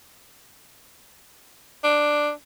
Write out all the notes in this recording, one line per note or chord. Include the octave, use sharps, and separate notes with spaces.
D4